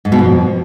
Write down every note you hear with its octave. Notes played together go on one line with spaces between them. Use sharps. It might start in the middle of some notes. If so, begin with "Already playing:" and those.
G#2
B2
F2